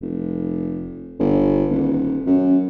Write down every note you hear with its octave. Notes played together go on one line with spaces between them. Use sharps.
F1
G1
D#1
F#2